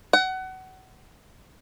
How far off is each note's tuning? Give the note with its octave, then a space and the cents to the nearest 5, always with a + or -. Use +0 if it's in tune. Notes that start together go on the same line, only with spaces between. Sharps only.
F#5 +25